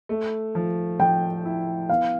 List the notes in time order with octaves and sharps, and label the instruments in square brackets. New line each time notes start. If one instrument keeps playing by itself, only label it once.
[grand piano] A3
F3
[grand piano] F3 [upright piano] G5
[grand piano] E4
[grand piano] B3 [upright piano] F5